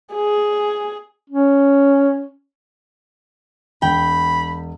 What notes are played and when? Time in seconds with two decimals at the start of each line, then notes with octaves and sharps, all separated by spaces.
0.14 G#4
1.30 C#4
3.82 E1 G5 B5